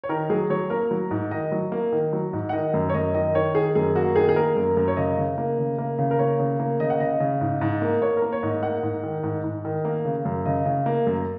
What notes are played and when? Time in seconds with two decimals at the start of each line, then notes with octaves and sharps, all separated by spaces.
0.04 C#5
0.09 D#3 A#4
0.30 F#3 G#4
0.50 F#3 C#5
0.70 A#3 A#4
0.91 F#3
1.11 G#2
1.31 D#3 D#5
1.52 F#3
1.72 A#3
1.92 D#3
2.13 F#3
2.33 G#2
2.49 F#5
2.53 D#3 D#5
2.74 F#2
2.89 C#5
2.94 F#2 D#5
3.14 D#3 D#5
3.35 D#3 C#5
3.55 D#3 G#4
3.75 F#2 G#4
3.95 A#3 F#4
4.16 D#3 G#4
4.29 G#4
4.36 A#3 A#4
4.56 F#2
4.77 F#2
4.88 C#5
4.97 C#3 D#5
5.17 C#3
5.38 A#3
5.58 C#3
5.78 A#3
5.98 C#3
6.11 A#4
6.19 A#3 C#5
6.40 C#3
6.60 A#3
6.80 C#3 D#5
6.90 F#5
7.00 C#3 D#5
7.20 C#3
7.41 G#2
7.61 G#2
7.82 A#3
8.02 A#3 C#5
8.17 A#4
8.22 A#3
8.32 C#5
8.43 G#2
8.48 D#5
8.63 A#3 F#5
8.83 G#2
9.03 D#3
9.23 G#2
9.44 G#2
9.65 D#3
9.85 A#3
10.05 C#3
10.25 F#2
10.46 C#3 D#5
10.66 C#3
10.86 A#3
11.07 F#2